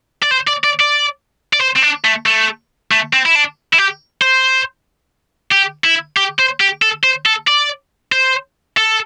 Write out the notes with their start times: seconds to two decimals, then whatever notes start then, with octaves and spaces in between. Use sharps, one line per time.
0.23 D5
0.31 C5
0.47 D5
0.64 D5
0.80 D5
1.53 D5
1.61 C5
1.76 C4
1.83 D4
2.05 A3
2.26 A3
2.91 A3
3.13 C4
3.26 E4
3.35 D4
3.73 E4
3.78 G4
4.21 C5
5.52 G4
5.84 E4
6.17 G4
6.39 C5
6.60 G4
6.82 A4
7.03 C5
7.26 A4
7.47 D5
8.12 C5
8.77 A4